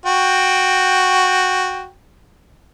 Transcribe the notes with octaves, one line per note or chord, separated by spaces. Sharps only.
F#4 G5